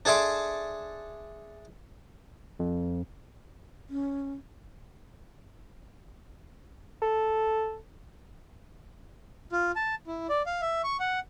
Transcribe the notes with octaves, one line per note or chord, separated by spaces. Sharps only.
D4 G#4 A4 E5 C6 D6
F2
C#4
A4
F4
A5
E4
D5
F5
E5
C#6
F#5